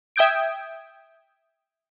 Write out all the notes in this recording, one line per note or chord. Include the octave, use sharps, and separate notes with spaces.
E5 G5 D#6 G6 G#6 D7